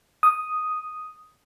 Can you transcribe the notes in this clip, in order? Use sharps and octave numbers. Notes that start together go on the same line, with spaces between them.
D#6